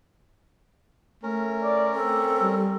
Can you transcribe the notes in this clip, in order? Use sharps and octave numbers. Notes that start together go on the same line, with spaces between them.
A3 C#4 A#4
D5
C4 A4
G3